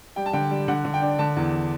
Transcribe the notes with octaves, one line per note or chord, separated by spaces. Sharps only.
G3 G5
A5
D3 G5
G3
D3 F#5
D3
G5
D4
D3 A5
E2